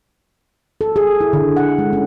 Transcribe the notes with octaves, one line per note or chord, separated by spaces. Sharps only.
A4
G#4
E4
D3
F#5
G#3
C#4